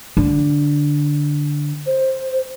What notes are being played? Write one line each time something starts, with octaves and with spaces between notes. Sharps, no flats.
D3
C5